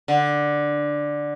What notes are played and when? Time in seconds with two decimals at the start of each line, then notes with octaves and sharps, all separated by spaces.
0.08 D3